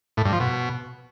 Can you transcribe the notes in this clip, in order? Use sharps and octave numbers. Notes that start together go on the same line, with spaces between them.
A2
G2
F3
B2